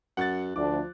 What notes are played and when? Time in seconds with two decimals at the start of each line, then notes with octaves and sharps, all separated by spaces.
0.17 F#2 F#5 F#6 A6
0.56 D2 F3 D4 D5 D6